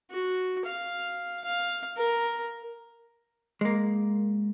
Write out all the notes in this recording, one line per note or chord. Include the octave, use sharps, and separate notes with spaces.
F#4
F5
F5
A#4
G#3 A#3